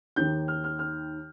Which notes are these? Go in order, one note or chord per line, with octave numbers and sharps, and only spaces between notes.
D#2 D#3 G6
F6
F6
F6